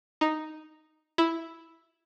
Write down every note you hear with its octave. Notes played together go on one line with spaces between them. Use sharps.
D#4
E4